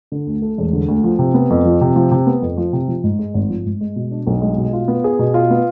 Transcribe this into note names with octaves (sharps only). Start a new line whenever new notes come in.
D3
D2
A3
E1
D3
D2
F3
C3
B3
F2
F3
C3
F3
C3
B3
F2
F3
C3
F3
G#2
G#3
G#1
F3
G#2
G#3
B2
D4
B1
G#3
B2
F4
B3
G#4
B2
F4
B3